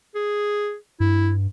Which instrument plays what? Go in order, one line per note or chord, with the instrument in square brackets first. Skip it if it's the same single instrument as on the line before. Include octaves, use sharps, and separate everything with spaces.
[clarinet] G#4
[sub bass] G2 [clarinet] E4